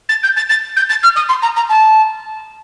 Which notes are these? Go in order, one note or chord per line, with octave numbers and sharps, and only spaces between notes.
A6
G6
A6
A6
G6
A6
F6
D#6
C6
A#5
A#5
A5